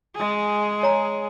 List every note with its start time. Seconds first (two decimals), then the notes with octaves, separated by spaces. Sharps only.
0.16 G#3 G#4
0.83 C#5 A#5